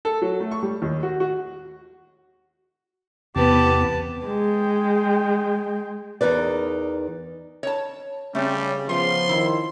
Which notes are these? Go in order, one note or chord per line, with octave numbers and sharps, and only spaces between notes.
A4
F#3
A3
C#6
G3
D#2
F#4
F#4
E2 C3 B3 G4 B4 A5
G#3 G5
E2 D#4 A#4 B4 D5
C#5 A5
C#3 G3 A3 C4 C#4
F3 B3 F5 C6
D#3 E4